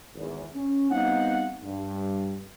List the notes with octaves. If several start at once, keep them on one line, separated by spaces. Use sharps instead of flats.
G#1 E2
C#4
G3 B3 C4 D#4 F5 F#5
G2